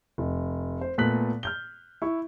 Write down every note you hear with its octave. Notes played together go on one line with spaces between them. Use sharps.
F1
C5
A#2 A3 B3 F#6 B6 F#7
F6 G6 G7
E4 C#6